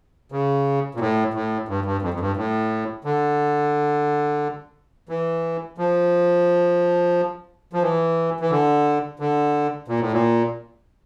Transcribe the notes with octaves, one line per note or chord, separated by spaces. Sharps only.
C#3
A#2
A2
A2
G2
G2
F2
F2
G2
A2
D3
E3
F3
F3
E3
E3
D3
D3
A#2
A2
A#2